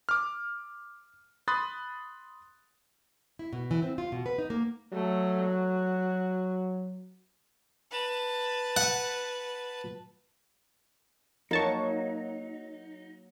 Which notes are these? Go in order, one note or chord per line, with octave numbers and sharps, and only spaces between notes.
D6 F6
B5 C6 D#6 F#6 A6
E4
B2
E3
C4
F4
B2
B4
D#4
A#3
F#3 A3
F#4
B4 A5
F#5
F2 F#3 A#3 D#4 A5 C#6